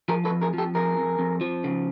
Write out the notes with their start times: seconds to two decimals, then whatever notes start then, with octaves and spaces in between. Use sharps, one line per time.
0.08 F3 G#4 A#4
0.25 A4 B4
0.30 F2
0.42 G#4 A#4
0.54 F3 G4 A4
0.75 F2 G#4 A#4
0.98 F2
1.19 F2
1.41 F3
1.64 C#3